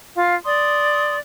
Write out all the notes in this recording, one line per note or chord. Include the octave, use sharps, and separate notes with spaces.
F4 F5
D5 C6 D#6